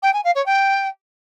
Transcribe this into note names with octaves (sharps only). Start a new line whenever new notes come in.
G5
G#5
F5
C#5
G5